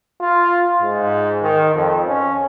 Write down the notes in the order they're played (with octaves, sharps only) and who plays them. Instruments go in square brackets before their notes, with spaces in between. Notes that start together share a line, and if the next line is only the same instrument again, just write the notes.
[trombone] F4
G#2
D#3
F2
C#4